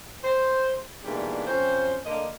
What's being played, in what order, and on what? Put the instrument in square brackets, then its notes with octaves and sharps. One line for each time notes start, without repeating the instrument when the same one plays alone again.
[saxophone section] C5
G#2 B2 E3 G3 A#3 D4
F2 C#4 C5
D3 A#3 D#5